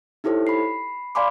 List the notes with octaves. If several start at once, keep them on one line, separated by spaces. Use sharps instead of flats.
D#4 E4 G4 A4 C5 C#5
B5 C7
D5 F5 G#5 B5 C6 D6